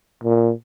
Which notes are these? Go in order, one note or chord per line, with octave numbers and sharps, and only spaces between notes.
A#2